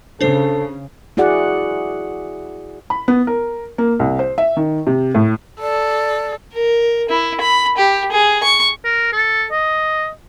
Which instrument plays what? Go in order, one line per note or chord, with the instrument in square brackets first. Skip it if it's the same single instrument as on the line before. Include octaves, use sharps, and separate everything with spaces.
[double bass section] C#3 [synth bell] D4 C5 C7 [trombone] A4
[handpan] E4 F#4 G#4 D5 F#5
[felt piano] B5
B3
A#4
A#3
C2
C5
E5
D#3
C3
A2
[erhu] A4 [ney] D5
[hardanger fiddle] A#4
E4
B5
G4
G#4
C#6
[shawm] A#4
A4
D#5